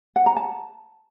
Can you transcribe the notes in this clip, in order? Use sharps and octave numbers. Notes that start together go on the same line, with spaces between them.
F#5
A#5
A5